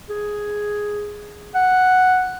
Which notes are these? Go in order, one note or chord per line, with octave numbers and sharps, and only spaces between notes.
G#4
F#5